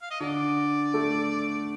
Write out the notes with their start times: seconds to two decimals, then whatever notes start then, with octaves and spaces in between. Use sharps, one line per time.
0.02 F5
0.11 D#5
0.20 D3 D4 D5
0.94 A3 A4